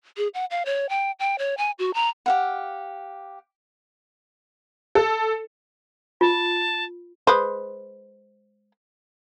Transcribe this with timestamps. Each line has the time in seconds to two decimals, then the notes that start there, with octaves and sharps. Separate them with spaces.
0.17 G#4
0.34 F#5
0.51 F5
0.66 C#5
0.89 G5
1.19 G5
1.39 C#5
1.58 G#5
1.79 F#4
1.94 A#5
2.26 G4 F5 F#5
4.95 A4
6.21 F4 A5
7.27 G#3 B4 C5